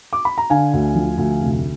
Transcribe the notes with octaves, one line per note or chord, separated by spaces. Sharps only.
D6
B5
A#5
D3 F5 G#5
D2
F3
D2
F1